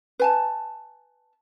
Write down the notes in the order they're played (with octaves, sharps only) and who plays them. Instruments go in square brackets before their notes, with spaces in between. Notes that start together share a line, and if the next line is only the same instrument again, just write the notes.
[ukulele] B4 G#5 A5